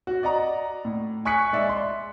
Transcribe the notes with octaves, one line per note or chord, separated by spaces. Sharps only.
F#4
D5 D#5 F#5 A#5
A2
G#5 C#6 F#6 B6 C#7
G#3 D5 E5
C6